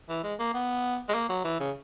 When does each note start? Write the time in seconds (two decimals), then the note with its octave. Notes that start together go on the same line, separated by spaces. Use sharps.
0.09 E3
0.23 G#3
0.39 A#3
0.54 B3
1.09 G#3
1.14 A#3
1.29 F#3
1.44 E3
1.60 C#3